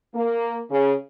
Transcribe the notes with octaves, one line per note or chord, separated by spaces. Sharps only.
A#3
C#3